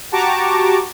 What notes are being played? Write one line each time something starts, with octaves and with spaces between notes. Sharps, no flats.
F#4 G4 A5 A#5 C#6 D6